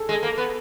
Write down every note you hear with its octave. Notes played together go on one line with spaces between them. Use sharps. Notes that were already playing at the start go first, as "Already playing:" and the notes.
Already playing: G#4 A4
G#3
A#3
B3